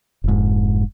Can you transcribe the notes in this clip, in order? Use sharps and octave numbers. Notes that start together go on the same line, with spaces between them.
F1 G#2